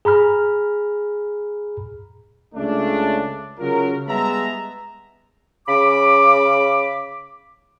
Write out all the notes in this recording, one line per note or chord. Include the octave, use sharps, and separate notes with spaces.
G#4 A#5 B5 F6
C#2 C#3 A3 D4
C#3 F#3 F4 A#4
G3 G#3 B3 E5 A5 A#5
C#3 B5 D6